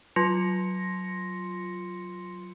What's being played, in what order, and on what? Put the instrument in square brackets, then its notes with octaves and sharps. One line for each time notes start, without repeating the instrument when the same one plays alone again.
[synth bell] F#3 F4 C6 A#6 C#7